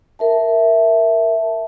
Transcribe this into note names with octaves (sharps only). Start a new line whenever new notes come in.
A#4 E5 A5